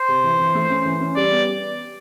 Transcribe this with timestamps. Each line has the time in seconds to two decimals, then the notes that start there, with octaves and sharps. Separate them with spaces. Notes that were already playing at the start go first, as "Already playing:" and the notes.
Already playing: C5
0.08 C3
0.24 E3
0.39 E3
0.55 A3
0.70 C#4
0.86 E3
1.00 C#4
1.16 G3 D5
1.31 B3